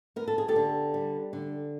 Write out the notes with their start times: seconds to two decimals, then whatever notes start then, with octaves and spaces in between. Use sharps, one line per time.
0.16 B3 A#4
0.28 A4
0.38 G#4
0.48 G4 A4
0.56 D3
0.94 G3
1.33 D3